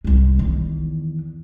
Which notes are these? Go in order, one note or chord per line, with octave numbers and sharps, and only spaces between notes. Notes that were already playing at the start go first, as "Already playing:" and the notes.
C2 G#3
E2 D#3